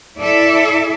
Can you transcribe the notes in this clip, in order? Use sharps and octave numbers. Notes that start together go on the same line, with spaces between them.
E4 A4 D5 E5